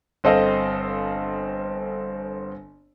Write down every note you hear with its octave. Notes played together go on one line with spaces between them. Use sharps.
G1 C4 A4 D#5 F5